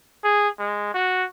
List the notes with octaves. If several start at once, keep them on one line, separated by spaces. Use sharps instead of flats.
G#4
G#3
F#4